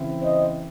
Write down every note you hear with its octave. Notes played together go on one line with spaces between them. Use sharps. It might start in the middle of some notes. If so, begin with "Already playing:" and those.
Already playing: C#3 E3 C4 E4
C5 D#5